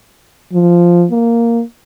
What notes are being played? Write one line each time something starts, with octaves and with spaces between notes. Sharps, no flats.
F3
A#3